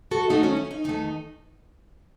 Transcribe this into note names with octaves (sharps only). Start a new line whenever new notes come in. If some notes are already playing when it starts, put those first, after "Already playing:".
F#4 A4
E2 D#3 A3 D#4 F#4
C#4 E4
C#4
D#4
E2 D#3 A3 D#4